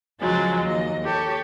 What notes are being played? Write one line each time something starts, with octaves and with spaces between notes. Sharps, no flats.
C#3 F3 F#3 G#3 A6
D#2 D#5
G4 A4 C#5